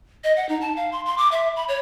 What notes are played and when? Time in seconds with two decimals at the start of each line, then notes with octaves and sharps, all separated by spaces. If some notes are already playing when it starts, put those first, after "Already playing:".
0.24 D#5
0.37 F#5
0.49 D#4
0.61 A5
0.77 F5
0.92 C6
1.06 C6
1.18 D6
1.32 E5
1.56 B5
1.68 C#5